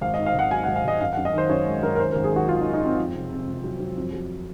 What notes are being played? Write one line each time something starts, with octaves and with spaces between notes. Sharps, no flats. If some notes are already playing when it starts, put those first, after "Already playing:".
G#1 F5
D#5
G#2
F5
G#1 F#5
F#3 G#5
F#5
G#1
F5
G#1 D#5
F#2 F5
F#5
F#2
D#5
D#3 C5
F#2 C#5
G#3
F#2 A#4
A#4
D#3 C5
A#4
G#1
G#4
D#3 F#4
D#3 F4
D#4
D#3
D#4
D#3 C4
F2
C3
C3
C3
F#3
F#3
F2
F#3